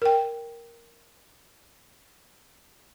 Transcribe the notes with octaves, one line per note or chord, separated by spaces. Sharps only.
A#4 G5